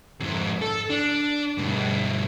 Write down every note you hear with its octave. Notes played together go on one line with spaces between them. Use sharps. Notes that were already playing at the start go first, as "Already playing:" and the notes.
F2 G#2
A4
D4
G2 B2